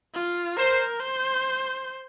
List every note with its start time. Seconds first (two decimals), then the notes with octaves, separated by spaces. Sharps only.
0.15 F4
0.57 A#4 C5
1.00 C5